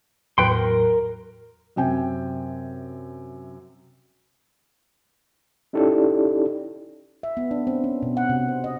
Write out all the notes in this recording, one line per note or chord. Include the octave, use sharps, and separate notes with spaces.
E2 A2 F#3 B4 G5 C6
A#4
F#2 C3 G5 G#5
C#4 D#4 E4 G4 A4 D5
E5
B3
D4
C4
C#4
B2
F#5
C3
C5
D#5